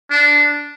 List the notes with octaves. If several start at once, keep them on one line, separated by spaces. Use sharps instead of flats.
D4